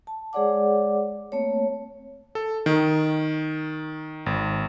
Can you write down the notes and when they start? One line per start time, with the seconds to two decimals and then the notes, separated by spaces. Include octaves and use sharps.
0.07 A5
0.33 G#3 G#4 C#5 D5 F#5 D6
1.32 A3 A#3 C4 C#5
2.35 A4
2.66 D#3
4.26 G#1